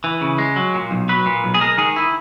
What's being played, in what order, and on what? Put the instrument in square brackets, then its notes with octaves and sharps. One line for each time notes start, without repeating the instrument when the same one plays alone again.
[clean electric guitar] E3
C#3
G#3
F#3
A#2
B1
F#3 B4
A#2
B1
G#4
G#3 A#4
D#3 G#4
E4